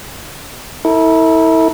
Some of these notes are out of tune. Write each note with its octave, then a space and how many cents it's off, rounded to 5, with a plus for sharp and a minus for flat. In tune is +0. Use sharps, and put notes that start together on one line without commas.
E4 -30 A4 +35